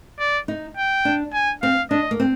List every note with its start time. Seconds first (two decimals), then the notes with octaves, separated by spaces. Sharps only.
0.19 D5
0.48 D#4
0.77 G5
1.05 D4
1.33 G#5
1.62 C4 F5
1.91 D4 D#5
2.11 A#3
2.20 C4